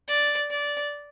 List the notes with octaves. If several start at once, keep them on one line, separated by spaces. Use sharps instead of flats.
D5
D5